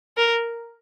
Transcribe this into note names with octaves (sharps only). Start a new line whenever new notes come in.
A#4